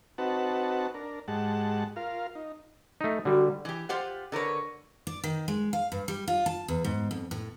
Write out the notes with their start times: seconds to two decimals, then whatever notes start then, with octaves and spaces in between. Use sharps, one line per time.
0.18 C4 D#4 F#4 B4 F#5 A5
0.94 D4 A#4
1.28 G#2 G#3 G4 F#5 A5
1.96 F4 A#4 F5
2.35 D#4
3.01 A3 D#4
3.25 D3 G3 F#4
3.65 E3 G4
3.89 F4 G4 C5 F#5
4.32 D3 A#4 B4 C#5
5.07 D5
5.24 D#3
5.48 G#3
5.73 F5
5.92 G2
6.08 G3
6.28 F4
6.46 A5
6.68 E2
6.84 G#2
7.11 F2
7.31 A2